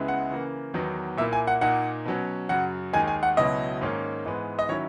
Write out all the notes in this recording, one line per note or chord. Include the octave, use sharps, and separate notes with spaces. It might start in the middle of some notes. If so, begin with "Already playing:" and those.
Already playing: C#2 C#3 G#3 B3 E4
F#5
C#3 E3 A#3
E2 D#3 F#3 B3 D#4
A#2 A#3 E4 E5
G#5
F#5
A#2 A#3 D#4 F#5
B2 F#3 C#4
F#2 C#3 F#3 F#5
D#2 D#3 G#3 G#5
G#5
F#5
C#2 B2 F#3 C#4 E4 D#5
G#2 D#3 A#3 C#4
G#2 E3 G#3 B3
D#5
D#3 F#3 C#4 E4 C#5